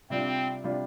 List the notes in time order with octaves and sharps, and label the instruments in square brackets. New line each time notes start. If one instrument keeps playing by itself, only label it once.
[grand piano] C3 G3 D4 F4 [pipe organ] C4
[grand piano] C3 G3 D4 F4